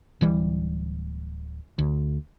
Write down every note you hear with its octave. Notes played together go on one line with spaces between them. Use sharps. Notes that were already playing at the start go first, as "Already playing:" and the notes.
D1 E3 G3
D2